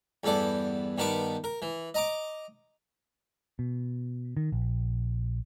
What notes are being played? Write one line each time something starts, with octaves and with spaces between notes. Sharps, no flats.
E2 G2 B3 A4 D5
G2 D#3 B3 A5 C#6 D6
A#4
E3
D#5 A#5 D6
B2
D#3
A#1